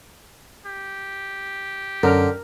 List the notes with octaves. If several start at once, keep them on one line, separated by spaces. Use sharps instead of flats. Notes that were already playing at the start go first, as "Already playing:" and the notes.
G4
F#2 D3 C#4 A#4